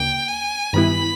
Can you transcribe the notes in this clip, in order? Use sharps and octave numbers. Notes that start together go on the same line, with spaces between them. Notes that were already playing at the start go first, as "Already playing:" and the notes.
Already playing: D2 C#3 A#3 G5
G#5
G2 D#3 G3 B3 E4 B5